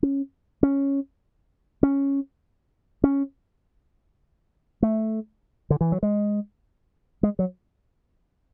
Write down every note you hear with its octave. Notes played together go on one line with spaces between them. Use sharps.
C#4
C#4
C#4
C#4
A3
D3
E3
F#3
G#3
G#3
F#3